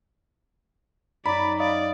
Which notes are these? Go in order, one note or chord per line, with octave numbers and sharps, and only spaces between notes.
F#2 D#4 D5 A#5 B5 D6
D5 D#5 F5 D#6